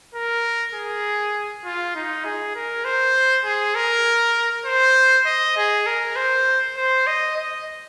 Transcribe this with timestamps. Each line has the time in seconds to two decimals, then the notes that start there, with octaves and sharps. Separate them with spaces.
0.15 A#4
0.74 G#4
1.65 F4
1.96 D#4
2.25 G#4
2.55 A#4
2.85 C5
3.45 G#4
3.75 A#4
4.66 C5
5.26 D#5
5.57 G#4
5.87 A#4
6.16 C5
6.77 C5
7.07 D#5
7.37 D#5